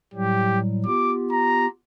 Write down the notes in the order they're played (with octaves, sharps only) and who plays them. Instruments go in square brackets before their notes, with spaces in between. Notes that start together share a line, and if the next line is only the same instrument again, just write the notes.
[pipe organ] A2 F#3 G3 [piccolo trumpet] G4
[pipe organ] B3 F4 G4 [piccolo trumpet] D6
[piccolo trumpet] A#5